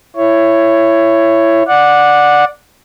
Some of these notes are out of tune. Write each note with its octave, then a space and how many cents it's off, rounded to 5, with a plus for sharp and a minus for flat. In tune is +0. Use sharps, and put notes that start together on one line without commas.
E4 +20 C#5 +0
D5 +5 F#5 -15